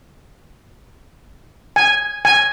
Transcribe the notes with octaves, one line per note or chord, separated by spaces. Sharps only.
G#5
G#5